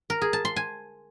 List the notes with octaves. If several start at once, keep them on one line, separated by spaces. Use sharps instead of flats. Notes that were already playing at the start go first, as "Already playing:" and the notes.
A#4
G#4
A5
C6
G#5